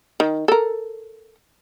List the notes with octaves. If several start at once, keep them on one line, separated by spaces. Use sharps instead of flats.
D#3
A4 A#4